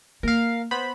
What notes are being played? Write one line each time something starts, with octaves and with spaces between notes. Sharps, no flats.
A#3 A#4 F5
B3 C5 B5